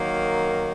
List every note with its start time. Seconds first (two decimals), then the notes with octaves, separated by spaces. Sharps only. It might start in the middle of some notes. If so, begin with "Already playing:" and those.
Already playing: D#3 F#3 A#3